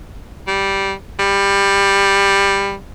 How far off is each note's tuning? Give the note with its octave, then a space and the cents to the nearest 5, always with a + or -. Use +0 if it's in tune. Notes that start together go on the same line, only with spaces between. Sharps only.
G3 -5
G3 +15